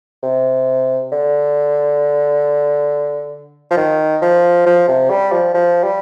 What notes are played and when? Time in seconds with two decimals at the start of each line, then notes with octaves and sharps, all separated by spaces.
0.23 C3
1.12 D3
3.71 F3
3.77 D#3
4.22 F3
4.66 F3
4.88 C3
5.10 G3
5.32 F3
5.54 F3
5.84 G3